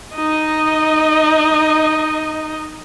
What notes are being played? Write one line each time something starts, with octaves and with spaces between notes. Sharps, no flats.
D#4 D#5